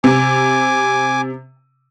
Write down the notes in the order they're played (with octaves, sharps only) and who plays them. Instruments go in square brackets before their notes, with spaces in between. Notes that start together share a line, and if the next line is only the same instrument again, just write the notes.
[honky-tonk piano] C3 [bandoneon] G#5 D6